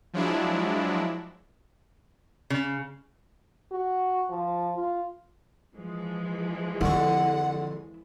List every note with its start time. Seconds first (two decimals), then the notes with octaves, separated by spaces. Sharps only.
0.13 F3 F#3 G#3 D4 E4
2.50 C#3
3.71 F#4
4.30 F3
4.76 F4
5.77 E3 F3 G#3
6.81 F2 D3 E4 F#5 C#6